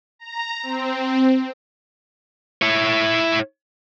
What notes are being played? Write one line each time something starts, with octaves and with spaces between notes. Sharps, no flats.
A#5
C4
E4 C#5